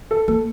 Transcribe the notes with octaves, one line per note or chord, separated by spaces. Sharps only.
A4
A#3 A4